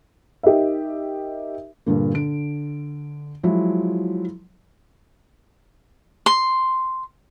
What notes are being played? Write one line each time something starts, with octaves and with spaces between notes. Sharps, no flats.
D#4 G4 A#4 D#5 E5
G2 A#2 D3 A#3
D3 D7
F3 F#3 G#3 E4
C6